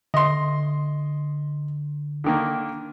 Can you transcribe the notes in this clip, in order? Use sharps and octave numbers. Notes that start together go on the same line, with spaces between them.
D3 D#5 C6
D3 D#3 A#3